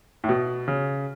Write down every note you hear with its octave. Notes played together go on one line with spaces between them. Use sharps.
A2
B2
C#3